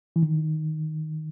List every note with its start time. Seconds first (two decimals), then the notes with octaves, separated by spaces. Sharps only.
0.16 E3
0.23 D#3